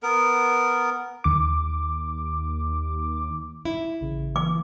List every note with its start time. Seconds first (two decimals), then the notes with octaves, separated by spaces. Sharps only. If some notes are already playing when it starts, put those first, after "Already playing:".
0.03 B3 A#4
1.24 D#2 D6
3.65 E4
4.01 A1 C#3
4.36 E3 A#3 D6